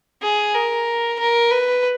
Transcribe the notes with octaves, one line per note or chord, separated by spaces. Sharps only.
G#4
A#4
A#4
B4